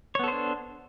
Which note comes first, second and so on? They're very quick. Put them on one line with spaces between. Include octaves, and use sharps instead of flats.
C#5 B3 A4 C5 D4